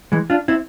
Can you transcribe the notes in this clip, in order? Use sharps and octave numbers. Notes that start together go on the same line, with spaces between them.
E3 G#3
D4 F4
C4 E4